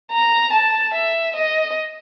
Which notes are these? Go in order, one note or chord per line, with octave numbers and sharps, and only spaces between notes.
A#5
A5
E5
D#5